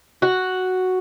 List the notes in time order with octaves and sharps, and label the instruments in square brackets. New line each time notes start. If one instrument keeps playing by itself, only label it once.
[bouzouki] F#4